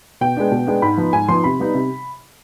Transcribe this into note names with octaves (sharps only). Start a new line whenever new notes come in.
B2 G5
G#3 B3 D4
B2
G#3 B3 D4
G#2 B5
F3 B3 D#4
G#2 G#5
F3 B3 D#4 C6
C3 B5
G3 B3 D#4
C3